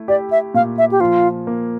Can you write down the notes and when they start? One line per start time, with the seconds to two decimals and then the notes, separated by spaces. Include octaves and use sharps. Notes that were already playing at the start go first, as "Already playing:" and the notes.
Already playing: A3 E4
0.08 G4 D5
0.31 E5
0.54 A#2 F5
0.78 E5
0.92 G4
1.00 F3 F4
1.47 A#3